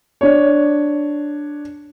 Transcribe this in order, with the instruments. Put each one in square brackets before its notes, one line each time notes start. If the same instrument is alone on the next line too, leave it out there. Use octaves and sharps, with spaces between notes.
[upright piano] D4 C#5